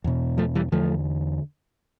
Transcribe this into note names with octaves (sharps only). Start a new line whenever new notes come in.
E2 B2
F3 A3
E3 G3
E2 D3 F3 A3